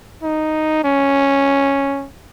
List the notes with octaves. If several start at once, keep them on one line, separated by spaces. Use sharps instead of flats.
D#4
C#4